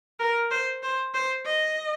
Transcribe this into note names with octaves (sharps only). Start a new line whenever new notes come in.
A#4
C5
C5
C5
D#5